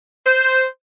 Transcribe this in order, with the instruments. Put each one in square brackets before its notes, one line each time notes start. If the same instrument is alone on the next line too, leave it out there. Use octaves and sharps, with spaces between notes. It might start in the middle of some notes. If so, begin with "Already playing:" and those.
[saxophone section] C5